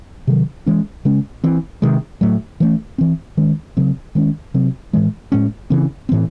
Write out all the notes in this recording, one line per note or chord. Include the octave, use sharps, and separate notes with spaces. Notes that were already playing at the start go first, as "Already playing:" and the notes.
C3 D#3 F#3
E3 G#3 C#4
C#3 G#3 C#4
E3 C4
C3 D#3 G#3
A2 F#3 A3
E3 A3 C#4
E3 C4
D#3 G#3 C#4
C#3 F#3 C4
D#3 G#3 C#4
C3 F#3 C4
A2 E3 G#3
A2 G#3 C#4
C#3 E3 C4
A2 E3 C4